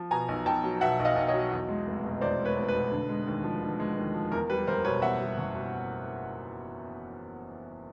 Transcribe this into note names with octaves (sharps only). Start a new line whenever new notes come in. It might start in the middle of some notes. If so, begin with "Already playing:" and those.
Already playing: F3
B2 G#5 A#5
B1
B1 G5 A5
F#3
B2 E5 F#5
B1
D#5 F5
B1
C#5 D#5
F#3
E2
G#3
F1
B2
E2 C5 D5
G#3
B4 C#5
F1
B4
B2
D3
G#3
D#2
F3
D3
G#3
D#2
F3
E2 A#4
G3 B4
F#1 A#4 C5
B2 B4 C#5
E2 E5 F#5
G3
F#1
B2